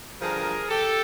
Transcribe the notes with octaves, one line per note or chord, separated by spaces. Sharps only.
G2 D3 F3 G#4 A#4
G4 A4